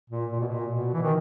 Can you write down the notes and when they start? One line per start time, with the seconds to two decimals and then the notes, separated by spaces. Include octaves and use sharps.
0.10 A#2
0.32 A#2
0.40 B2
0.48 A#2
0.72 B2
0.93 E3
1.02 D#3